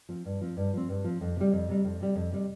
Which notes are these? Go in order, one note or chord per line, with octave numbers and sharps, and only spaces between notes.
F3 C4
G2
F3 C4
G2
F3 C4
G2
F3 C4
F2
C3 G3
F2
C3 G3
F2
C3 G3
F2
C3 G3